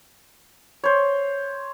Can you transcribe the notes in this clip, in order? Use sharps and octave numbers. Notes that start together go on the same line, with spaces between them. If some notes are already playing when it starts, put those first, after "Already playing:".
C5 C#5